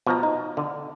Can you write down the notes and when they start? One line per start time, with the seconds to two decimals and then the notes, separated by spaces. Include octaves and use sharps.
0.07 B2 F3 A#5
0.23 D#4
0.57 D3